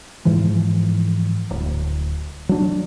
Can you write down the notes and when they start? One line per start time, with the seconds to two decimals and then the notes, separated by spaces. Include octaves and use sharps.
0.25 G#2 E3 F3 G#3
1.50 D1
2.49 F#3 D4